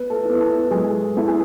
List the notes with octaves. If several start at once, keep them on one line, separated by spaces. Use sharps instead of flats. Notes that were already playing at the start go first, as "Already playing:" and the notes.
Already playing: B3 B4
A3 A4
B3 E4
A3 A4
F#3 G#3 G#4
B3 E4 A4
G#4